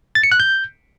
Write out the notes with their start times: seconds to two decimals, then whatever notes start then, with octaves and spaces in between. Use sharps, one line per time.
0.15 A6
0.23 C#7
0.32 F#6
0.40 G6